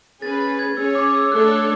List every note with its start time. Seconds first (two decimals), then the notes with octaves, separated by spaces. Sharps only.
0.22 C#4 G#4 B4 A6
0.40 A6
0.59 G#6
0.77 C#4 G#4 C#5 E6
0.95 D6
1.14 E6
1.32 A3 D4 A4 C#5 F#6
1.51 F#6